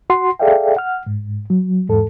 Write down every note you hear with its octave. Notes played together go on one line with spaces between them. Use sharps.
F#4 F#5 C6
G#4 A4 D5 E5 F5 G5
F#5 F6
G#2
F#3
E2 G#2 A4